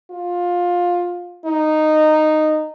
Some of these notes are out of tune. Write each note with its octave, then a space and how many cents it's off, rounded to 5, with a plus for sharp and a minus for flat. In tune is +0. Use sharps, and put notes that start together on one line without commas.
F4 +15
D#4 -10